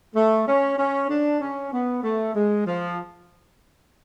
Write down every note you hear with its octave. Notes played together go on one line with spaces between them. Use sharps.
A3
C#4
C#4
D4
C#4
B3
A3
G#3
F3